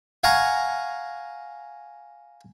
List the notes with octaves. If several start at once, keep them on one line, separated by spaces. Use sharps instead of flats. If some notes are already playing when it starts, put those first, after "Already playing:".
F5 F#5 G#5 A#5 C#6